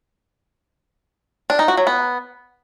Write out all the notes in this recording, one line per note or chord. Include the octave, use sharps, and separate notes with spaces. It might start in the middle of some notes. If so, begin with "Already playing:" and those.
D4
D#4
F#4
F#3
B3